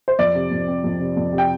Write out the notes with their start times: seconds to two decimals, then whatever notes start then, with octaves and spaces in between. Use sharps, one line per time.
0.08 C5
0.19 F2 D5
0.35 C3
0.51 F2
0.68 C4
0.84 F2
1.00 C3
1.16 F2
1.32 C3
1.38 G5